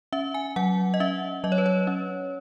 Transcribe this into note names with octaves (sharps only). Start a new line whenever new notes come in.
C#4 E5
G#5
F#3 F#5
D#5
C#4 E5
F#3 D#5
C#5
B4
C#5
C#4